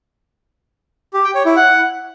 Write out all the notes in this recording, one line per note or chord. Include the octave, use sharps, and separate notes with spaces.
G4
G5
C#5
E4
F#5